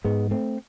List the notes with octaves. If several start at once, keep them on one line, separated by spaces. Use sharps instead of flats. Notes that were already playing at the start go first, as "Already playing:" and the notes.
G#2 G#3 B3
A3 C4